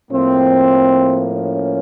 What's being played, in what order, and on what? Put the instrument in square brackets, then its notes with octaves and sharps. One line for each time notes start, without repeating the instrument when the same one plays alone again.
[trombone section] A2 F3 A#3 C4
C#4